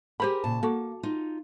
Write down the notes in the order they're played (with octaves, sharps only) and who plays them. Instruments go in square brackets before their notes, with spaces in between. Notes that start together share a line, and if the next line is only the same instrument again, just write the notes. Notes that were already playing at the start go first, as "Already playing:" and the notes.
[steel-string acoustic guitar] G4 G#4 A#4 [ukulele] C5 B5
[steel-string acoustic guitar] A#2 C#3 A5
[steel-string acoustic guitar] A#3 [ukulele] F#4 A4
[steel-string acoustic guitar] D#4 F4